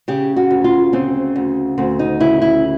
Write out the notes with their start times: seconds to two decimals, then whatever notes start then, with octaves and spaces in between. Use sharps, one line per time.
0.08 C#3 G4
0.36 F#4
0.50 D2
0.64 F4
0.93 C#3 C4
1.36 D2
1.78 D2 C4
1.99 D#4
2.20 C#3 E4
2.42 E4